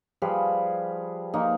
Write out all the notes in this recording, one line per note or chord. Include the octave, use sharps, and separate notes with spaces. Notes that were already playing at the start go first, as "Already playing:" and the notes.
F3 G3 G#4 B4
F3 A#3 D#4